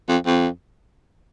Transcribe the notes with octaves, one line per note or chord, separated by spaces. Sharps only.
F2
F2